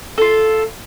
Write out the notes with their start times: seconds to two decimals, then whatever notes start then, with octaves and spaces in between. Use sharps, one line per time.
0.18 F4 A4